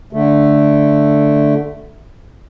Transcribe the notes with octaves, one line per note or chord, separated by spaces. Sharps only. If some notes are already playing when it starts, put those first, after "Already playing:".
D3 A3